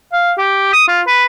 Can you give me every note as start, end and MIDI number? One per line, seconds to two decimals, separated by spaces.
0.13 0.32 77
0.38 0.72 67
0.73 0.85 87
0.88 1.02 65
1.07 1.25 71